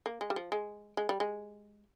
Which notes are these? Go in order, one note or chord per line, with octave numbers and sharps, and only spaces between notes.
A#3
G#3
G3
F3
G#3
G#3
G3
G#3